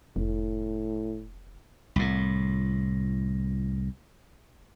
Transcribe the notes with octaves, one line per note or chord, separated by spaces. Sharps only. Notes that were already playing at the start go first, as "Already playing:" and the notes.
F1 A2
C2 A2